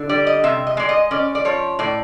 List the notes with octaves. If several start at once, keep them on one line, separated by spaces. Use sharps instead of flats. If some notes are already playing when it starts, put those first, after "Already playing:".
Already playing: D3
G3 D5
D#5
C3 E5
D#5
G#3 D5
D#5
C#4 D5
D5
F3 C#5
A2 D5